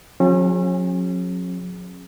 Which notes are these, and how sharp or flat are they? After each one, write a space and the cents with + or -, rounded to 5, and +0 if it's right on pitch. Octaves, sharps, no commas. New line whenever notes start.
F#3 -40 C#4 -40 G#4 -5